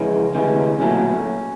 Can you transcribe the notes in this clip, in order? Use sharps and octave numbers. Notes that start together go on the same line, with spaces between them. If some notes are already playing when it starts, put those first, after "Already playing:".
Already playing: F2 C#3 E3 G#3 C#4
D2 C3 E3 G#3 C#4
B1 A#2 F#3 A3 C#4